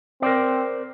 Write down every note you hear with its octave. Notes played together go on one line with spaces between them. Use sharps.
C4 A#4 C5 D5